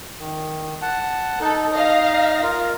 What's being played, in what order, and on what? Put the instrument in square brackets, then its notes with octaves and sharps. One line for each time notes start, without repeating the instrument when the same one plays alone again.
[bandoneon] D#3
F#5 A5
[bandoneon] D#4 [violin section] A4
[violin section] D#5 F5 A#6
[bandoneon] F4 A#4